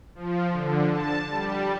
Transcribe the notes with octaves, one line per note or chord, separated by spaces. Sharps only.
F3
D3
A5
G3